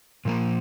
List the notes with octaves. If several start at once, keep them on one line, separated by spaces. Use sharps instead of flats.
A#2 F3 A#3